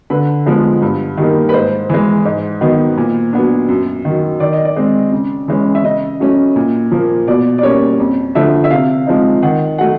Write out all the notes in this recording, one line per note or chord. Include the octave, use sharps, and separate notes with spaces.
D3 B4
F3 G#3 B3
G2
D#3 G3 A#3 D#4
B4
G#2 C5
E3 G#3
G#2
D#3 F#3 B3 D#4
A#2
F#3 B3 D4
F#2
D#3 F#3
D#3 D5
D#5
D5
G#3 C4
C#3
E3 G#3 C#4
E5
C#3 D#5
F#3 A3 C#4
A#2
F3 A#3
B2 D5
D5
G3 A#3 C#4 C#5
F2
D3 F3 A3 D4 E5
E5
C3 F5
F3 G#3 C4 D#4
D#3 F#5
F#3 A3 F#5